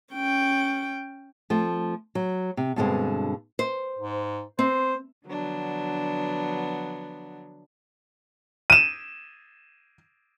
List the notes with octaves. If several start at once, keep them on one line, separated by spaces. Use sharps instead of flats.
C#4 G5
F3 A3 C4
F#3
C3
G2 B2 D3 G#3 C4
C5
G#2
C4 C5
D3 F3 F#3 B3 D4
D#7 E7